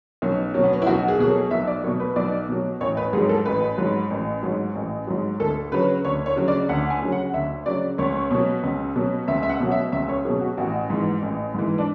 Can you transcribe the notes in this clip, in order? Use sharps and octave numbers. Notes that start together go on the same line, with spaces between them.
B1 C#4
B2 F#3 C#4
B3
C#4
E4
B1 F#4
G#4
B2 F#3 G#4
A4
B1 E5
D5
B2 F#3 C#5
B4
B1 D5
B2 F#3
A1 C#5
B4
G#2 F#3 G#4
A4
A1 B4
G#2 F#3
A1
G#2 F#3
A1
G#2 F#3
D2 A4
C#3 F#3 B4
D2 C#5
C#5
C#3 F#3
D5
D2 F#5
G#5
C#3 F#3
F#5
D2 E5
C#3 F#3 D5
C#2 C#5
B2 F#3
C#2
B2 F#3
C#2 E5
E5
F#5
B2 F#3
E5
C#2 E5
C#5
B2 F#3 G#4
F#4
A1 F#4
G#2 E3
A1
G#2 E3
D4